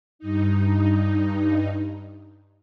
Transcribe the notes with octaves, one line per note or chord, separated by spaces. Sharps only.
G2 D#4